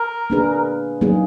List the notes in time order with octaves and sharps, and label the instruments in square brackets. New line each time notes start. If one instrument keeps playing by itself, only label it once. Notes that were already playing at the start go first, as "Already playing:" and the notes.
Already playing: [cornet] A#4
[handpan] A#3 D4 G#4 B4
F#3 A#3 D#4 G#4